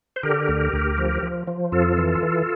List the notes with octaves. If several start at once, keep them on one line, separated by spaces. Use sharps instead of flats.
C5
D3 G4 A#4
D2
D2
F3
F3
F3
F2 F4 A4
E3
E3